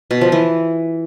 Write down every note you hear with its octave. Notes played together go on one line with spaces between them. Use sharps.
B2
F3
E3